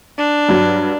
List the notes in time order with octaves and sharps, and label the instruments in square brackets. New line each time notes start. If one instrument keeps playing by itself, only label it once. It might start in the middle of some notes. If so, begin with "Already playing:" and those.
[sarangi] D4
[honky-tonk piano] G2 F#3